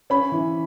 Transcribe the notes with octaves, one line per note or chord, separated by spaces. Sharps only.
C#4 B5
E3